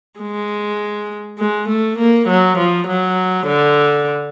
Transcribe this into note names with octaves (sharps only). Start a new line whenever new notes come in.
G#3
G#3
A3
A#3
F#3
F3
F#3
D3